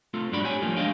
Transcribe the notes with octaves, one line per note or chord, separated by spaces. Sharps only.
A3 C4 F4 A4
G2 F#3 G#3 D4 D5 B5
G4 C#5 G5 G#5
F3 G3 A3 A#3 D#4 F4
G#3 D4 G4 D#5 F5 G5